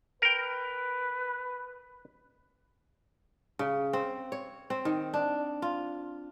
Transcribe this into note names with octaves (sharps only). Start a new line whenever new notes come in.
A#4 B4 G5
C#3
C4
C#5
C4
D#3
D4
F4